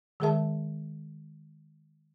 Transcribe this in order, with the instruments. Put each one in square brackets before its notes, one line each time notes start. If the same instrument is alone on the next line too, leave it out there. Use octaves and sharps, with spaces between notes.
[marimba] D#3 G#3 G#4 A#4 E5 A5